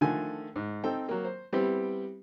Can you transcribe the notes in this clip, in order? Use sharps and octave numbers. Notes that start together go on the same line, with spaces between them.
D3 D#3 F3 A3 G#5
G#2
C4 D#4 A4 G5
F#3 A#3
C5
G3 B3 C4 E4 G4